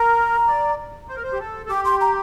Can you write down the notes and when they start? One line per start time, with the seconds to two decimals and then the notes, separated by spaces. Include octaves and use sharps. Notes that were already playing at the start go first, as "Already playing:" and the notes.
Already playing: A#4 A#5
0.48 D5
1.09 C5
1.16 A#4
1.23 C5
1.33 G4
1.39 A4
1.66 A4
1.70 G4 D6
1.85 C6
2.01 A#5